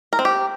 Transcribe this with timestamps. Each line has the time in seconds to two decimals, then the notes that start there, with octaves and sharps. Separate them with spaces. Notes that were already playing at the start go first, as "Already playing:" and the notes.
0.13 A#4
0.19 C4
0.25 G4